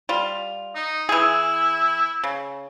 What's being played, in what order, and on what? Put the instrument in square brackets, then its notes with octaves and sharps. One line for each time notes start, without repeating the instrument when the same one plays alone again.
[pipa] G3 F4
[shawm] D#4
[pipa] E3 G#4 [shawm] E4
[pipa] C#3